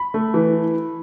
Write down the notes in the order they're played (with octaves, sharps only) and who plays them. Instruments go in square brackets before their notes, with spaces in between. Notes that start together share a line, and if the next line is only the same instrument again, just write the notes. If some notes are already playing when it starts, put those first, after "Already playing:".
Already playing: [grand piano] B5
A3
E3